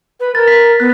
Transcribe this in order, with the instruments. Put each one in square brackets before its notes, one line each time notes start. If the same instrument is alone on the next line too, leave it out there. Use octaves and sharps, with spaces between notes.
[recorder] B4
[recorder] A#4 [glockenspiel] A6
[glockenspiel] B6
[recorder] B3 [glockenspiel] F#6